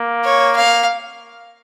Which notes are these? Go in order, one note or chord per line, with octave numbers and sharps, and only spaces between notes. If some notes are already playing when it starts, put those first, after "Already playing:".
Already playing: A#3
C#5
F5